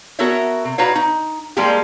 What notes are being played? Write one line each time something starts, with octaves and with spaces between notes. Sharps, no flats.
B3 F#4 A4 A#4 C#5 E5
C3
D#4 F#4 G4 B4 C#5 F5
D#4
F3 G3 G#3 A#3 F4 G4